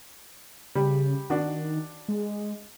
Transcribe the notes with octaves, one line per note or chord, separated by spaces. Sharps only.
C#3 G3
D#3 D4 F#4
G#3